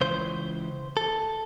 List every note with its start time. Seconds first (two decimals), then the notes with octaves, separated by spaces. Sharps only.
0.01 C#2 C#3 E3 C5
0.97 A4